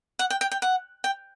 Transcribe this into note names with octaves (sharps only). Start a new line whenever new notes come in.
F#5
G5
G5
G5
F#5
G5